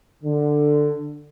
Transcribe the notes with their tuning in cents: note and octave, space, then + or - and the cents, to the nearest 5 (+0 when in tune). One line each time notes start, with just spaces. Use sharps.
D3 +10